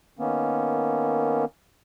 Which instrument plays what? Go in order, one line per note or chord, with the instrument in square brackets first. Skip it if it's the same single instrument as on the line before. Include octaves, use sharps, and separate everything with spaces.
[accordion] D#3 A#3 B3 C#4